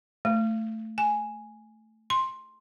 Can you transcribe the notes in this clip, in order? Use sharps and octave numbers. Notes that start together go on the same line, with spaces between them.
A3
G#5
C6